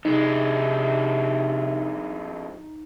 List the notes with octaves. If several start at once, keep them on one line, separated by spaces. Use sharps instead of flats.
F2 C3 G#3 D#4